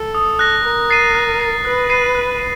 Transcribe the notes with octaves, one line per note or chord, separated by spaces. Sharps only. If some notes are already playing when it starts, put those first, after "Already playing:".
Already playing: A4
D#6
F#6 A#6
A#4 F#6
A6 C7 D#7
F#6
A6 C7 D#7
B4 F#6
A6 C7 D#7
F#6
D#7